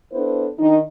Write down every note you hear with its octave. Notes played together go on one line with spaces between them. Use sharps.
B3 D4 E4 A4 B4 C5
D#3 D4 D#4